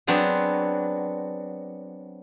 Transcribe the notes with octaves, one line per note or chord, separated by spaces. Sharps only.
F#3 B3 C4 D4 G#4